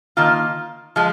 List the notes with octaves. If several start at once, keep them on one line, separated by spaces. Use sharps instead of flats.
D#3 A#3 F4
F3 G#3